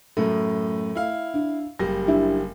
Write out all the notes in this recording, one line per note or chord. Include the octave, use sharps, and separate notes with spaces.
F#2 A2 A3
E4 F5
D4
F#1 G3 A#6
D4 E4 G4